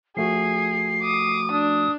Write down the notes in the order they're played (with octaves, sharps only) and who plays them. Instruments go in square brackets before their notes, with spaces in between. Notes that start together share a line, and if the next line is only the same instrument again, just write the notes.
[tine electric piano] F3 A3 F#4 [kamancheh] G#4 [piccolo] C7
[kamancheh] D6 D#6
[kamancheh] D4 [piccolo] D#6